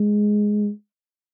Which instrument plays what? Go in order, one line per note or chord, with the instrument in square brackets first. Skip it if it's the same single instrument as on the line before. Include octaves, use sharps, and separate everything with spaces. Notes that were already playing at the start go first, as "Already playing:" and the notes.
Already playing: [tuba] G#3